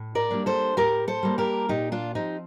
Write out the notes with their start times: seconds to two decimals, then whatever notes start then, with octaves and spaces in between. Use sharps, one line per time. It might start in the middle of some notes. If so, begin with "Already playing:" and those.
Already playing: A2
0.15 A#4 D5
0.30 G3 A#3 D4
0.46 A4 C5
0.77 A2 G4 A#4
1.08 A4 C5
1.23 G3 A#3 D4
1.38 G4 A#4
1.69 A#2 D#4 G4
1.92 D4 F4
2.15 F3 C4 D#4 G4